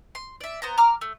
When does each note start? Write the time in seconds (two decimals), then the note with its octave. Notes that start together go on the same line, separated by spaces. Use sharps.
0.15 C6
0.41 D5 E5
0.62 B3 C5 A#5
0.78 A#5 D6 F6
1.01 A3